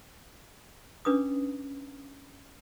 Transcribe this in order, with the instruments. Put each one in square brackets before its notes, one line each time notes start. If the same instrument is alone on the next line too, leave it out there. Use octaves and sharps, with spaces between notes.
[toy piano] C#4 D4 B4 D6 D#6